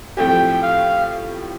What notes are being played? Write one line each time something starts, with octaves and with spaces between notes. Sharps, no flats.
A2 F3 A3 C4 G4 G5
F5